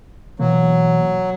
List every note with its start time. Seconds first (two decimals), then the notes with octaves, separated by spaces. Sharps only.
0.39 B2 E3 F#3 A#3